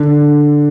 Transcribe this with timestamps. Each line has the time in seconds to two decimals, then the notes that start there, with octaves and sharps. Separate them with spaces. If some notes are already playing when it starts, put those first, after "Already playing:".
Already playing: D3